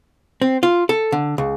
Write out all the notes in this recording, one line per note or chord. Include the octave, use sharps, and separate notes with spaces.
C4
F4
A4
D3
C#2